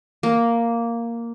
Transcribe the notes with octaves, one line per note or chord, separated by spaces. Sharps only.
A#3